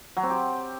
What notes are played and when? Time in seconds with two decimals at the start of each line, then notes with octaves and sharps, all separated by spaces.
0.17 F#3
0.23 C4
0.30 G4